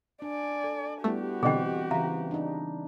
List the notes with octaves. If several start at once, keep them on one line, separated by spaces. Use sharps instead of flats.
D4 D5 G#5
A4
G3 A3 B3 E4 F#4 G4
B2 D3 E3 C4 G#4 D#5 G5
C#3 E3 E5 F5 A#5
D4 D#4